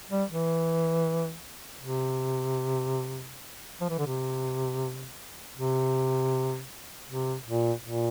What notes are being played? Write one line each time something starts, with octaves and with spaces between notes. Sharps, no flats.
G3
E3
C3
F3
E3
D3
C3
C3
C3
A#2
A#2